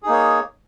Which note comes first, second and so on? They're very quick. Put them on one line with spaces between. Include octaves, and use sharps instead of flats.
G#4 D#4 A#3 C#5